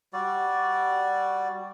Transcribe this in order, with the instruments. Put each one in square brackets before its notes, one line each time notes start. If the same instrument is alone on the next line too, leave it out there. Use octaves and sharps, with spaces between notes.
[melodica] G3 F#4 D5